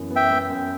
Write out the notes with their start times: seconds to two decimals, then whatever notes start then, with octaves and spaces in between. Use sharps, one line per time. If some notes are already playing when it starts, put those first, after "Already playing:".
Already playing: F#2 E3 B3
0.11 B3
0.16 E5 G5
0.31 B3
0.50 F#2